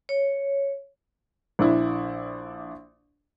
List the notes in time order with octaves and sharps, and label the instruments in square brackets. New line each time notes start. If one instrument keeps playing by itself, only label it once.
[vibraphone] C#5
[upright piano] A#1 D4 E4